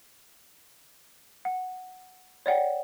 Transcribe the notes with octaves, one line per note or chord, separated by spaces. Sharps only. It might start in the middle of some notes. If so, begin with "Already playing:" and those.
F#5
C#5 D5 F#5 G5